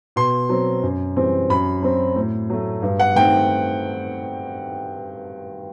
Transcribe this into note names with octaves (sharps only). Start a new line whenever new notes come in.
B2 C6
F#3 C4
F#2
E3 G3 C4
F#2 B5
F#3 C4
A2
F#3 A3
G2
F#5
D#3 A3 C4 G5